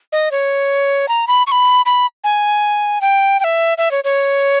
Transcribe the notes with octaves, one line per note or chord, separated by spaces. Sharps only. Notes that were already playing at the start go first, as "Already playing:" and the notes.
D#5
C#5
A#5
B5
C#6
B5
B5
G#5
G5
G5
E5
E5
C#5
C#5